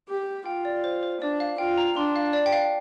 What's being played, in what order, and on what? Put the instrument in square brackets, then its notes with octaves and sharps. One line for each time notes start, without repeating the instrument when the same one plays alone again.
[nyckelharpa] G4
[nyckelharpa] F4 [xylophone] G5
[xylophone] D5
C5
C5
[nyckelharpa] D4 [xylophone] D5
[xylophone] F5
[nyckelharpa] F4 [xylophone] G5
[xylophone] A#5
[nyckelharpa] D4 [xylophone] C6
[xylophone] F5
D5
G5
F5